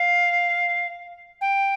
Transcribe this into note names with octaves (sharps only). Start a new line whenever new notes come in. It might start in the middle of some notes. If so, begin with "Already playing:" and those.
Already playing: F5
G5